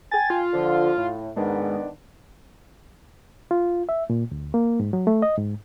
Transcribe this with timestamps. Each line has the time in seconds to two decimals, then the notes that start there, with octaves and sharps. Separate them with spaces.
0.11 G5 G#5 A6
0.30 F4
0.53 D3 F3
0.97 A2
1.36 G#2 D#3 B3 D4
3.51 F4
3.89 E5
4.10 A#2
4.32 D2
4.54 A#3
4.80 G#2
4.93 F#3
5.07 A3
5.22 D#5
5.38 G#2